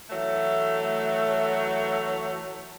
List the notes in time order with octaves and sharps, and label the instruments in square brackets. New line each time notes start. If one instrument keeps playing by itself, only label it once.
[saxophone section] E3 F#3 A3